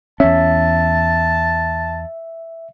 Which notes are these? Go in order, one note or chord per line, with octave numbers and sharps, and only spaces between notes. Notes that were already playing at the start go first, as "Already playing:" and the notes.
E2 C#4 E5 A5